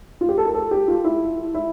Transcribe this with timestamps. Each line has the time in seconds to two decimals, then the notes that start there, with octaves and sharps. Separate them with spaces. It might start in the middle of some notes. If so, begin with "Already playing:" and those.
0.21 F4
0.29 G4
0.38 A4
0.46 A#4
0.54 A4
0.71 G4
0.88 F4
1.04 E4
1.54 E4